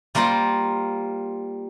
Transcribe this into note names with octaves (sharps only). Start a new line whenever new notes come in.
G3 A#3 F4 A#4 C5